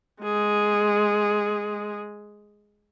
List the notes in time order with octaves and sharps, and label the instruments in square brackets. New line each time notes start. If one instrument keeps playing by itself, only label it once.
[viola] G#3 G#4